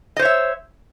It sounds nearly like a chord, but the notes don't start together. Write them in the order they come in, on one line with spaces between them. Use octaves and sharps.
D#5 C5 C#5 E5